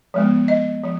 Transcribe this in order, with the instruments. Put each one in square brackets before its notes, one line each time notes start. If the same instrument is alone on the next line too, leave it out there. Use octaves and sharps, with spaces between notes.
[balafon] F3 G#3 B3
D#5
F3